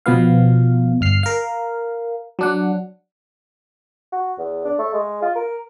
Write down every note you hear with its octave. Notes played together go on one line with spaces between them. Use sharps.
B2 F3 B3 F5
G1 F6 C7
A#4 F5
F#3 D4 F#5
F#4
E2
D4
A3
G#3
F4
A#4